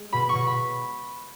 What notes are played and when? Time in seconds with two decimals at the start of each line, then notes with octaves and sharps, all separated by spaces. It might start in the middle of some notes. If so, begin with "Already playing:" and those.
Already playing: G#3
0.12 B2 B5
0.29 C#6
0.35 B2
0.47 B5